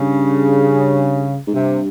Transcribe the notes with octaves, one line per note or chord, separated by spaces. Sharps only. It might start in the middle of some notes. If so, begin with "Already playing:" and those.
Already playing: G2 C#3
G#2
G2 C3